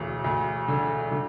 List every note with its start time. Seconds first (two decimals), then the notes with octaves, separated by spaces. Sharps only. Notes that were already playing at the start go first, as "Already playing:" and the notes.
Already playing: E1 D2
0.24 D2
0.68 D3
1.11 D3